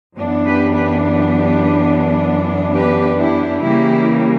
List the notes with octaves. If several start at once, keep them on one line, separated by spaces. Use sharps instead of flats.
F#2 E3 B3 D4
G4 B4
G4 B4
G4 B4
G4 B4
E4 G4
C#3 E3 G3 A#3 E4 G4